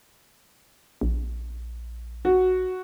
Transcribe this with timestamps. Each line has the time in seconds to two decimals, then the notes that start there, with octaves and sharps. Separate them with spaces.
1.01 A#1
2.25 F#4